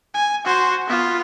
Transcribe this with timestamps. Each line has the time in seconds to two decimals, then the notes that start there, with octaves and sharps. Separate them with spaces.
0.14 G#5
0.45 F#4 C5
0.87 B3 F4